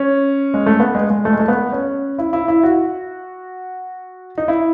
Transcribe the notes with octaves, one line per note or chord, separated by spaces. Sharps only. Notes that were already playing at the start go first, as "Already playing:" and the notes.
Already playing: C#4
G#3
A3
B3
G#3
G#3
A3
G#3
A3
B3
C#4
E4
E4
E4
F#4
D#4
E4